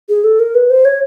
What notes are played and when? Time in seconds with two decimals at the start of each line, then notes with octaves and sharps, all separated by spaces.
0.09 G#4
0.24 A4
0.40 A#4
0.55 B4
0.70 C5
0.85 C#5